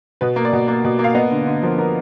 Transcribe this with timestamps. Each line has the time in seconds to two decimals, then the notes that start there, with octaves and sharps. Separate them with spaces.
0.21 B2 B4
0.36 A#3
0.45 D5
0.53 B2
0.68 A#3
0.84 B2
0.99 A#3
1.04 F5
1.15 B3 D#5
1.31 D3
1.46 D3
1.63 F3 A#4
1.78 B3 A#4